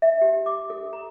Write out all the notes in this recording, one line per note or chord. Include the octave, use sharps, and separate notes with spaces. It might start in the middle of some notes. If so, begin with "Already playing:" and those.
E5
G4
D6
A4
A#5